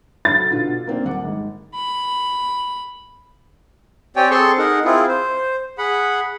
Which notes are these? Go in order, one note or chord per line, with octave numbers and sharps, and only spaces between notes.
F#3 A4 B5 A6
B2 D3 F4
A#3 C4 D4
D#1 F#5 D6
G#1
B5
C4 G4 C#5 D5 G5 G#5
C4 G#4 A4 A5 C6 C#6
D#4 G#4 A#4 F#5
C4 E4 F4 G#4
C5
G#4 F#5 B5